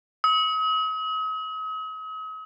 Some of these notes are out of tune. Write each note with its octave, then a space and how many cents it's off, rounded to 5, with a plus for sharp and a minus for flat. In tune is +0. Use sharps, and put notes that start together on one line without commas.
D#6 +45